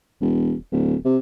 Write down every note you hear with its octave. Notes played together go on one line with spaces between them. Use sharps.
E1
D1
C3